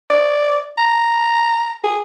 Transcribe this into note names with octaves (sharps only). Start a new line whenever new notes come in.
D5
A#5
G#4